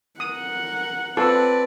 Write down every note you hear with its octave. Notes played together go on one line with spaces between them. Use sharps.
A#4 F#5 D#6
C4 F4 A4 B4 D5 A5